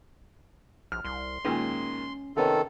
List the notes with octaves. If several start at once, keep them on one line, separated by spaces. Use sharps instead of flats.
A#1 F6
C2 C6
A#2 D#3 G#3 C#4
C3 D#3 B3 C#4 A4